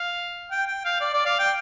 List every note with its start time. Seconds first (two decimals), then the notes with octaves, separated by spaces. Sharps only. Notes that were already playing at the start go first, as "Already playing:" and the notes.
Already playing: F5
0.51 G5
0.67 G5
0.85 F5
1.00 D5
1.13 D5
1.25 F5
1.39 G5